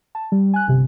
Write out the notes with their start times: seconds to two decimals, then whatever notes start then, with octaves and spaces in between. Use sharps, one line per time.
0.15 A5
0.32 G3
0.54 G#5 F#6
0.68 G1 C3